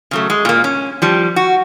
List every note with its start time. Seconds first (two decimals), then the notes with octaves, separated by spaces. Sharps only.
0.11 C#3 F#3 A3
0.30 G#3
0.45 A#2 A#3
0.64 C#4
1.02 F3 G3
1.36 F#4